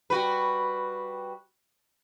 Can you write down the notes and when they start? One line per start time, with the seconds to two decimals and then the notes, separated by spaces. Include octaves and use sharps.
0.10 G3 F#4 B4